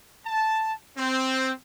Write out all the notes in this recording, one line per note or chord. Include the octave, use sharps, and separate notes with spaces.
A5
C4